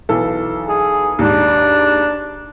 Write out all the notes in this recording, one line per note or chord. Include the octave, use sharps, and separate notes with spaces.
B1 E3 A4
G#4
D#2 G#2 D4